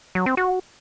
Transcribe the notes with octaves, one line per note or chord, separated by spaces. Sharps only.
F#3
C4
F#4